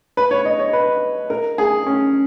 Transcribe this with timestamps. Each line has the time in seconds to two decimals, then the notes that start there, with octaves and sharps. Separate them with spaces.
0.17 B4
0.31 C#5
0.45 D#5
0.59 C#5
0.73 B4
1.30 A#4
1.58 G#4
1.87 C#4